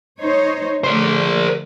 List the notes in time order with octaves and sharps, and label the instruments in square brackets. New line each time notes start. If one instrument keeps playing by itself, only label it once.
[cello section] D#4 C5 C#5
[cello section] D3 F3 A3 [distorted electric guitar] A#4 C5